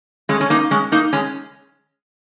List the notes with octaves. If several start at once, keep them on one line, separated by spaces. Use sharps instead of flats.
G#3 C#4
C#4
A#3 D#4
G#3 C#4
A#3 D#4
G#3 C#4